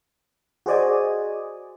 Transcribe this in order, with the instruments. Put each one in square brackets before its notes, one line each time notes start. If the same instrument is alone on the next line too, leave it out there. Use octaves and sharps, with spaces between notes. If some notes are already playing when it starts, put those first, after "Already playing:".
[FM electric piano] F#4 G#4 C5 D5 D#5 G#5